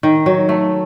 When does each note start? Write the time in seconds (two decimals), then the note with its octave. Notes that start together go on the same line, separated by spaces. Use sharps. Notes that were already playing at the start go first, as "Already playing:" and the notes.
0.03 D#3
0.26 F#3
0.49 A3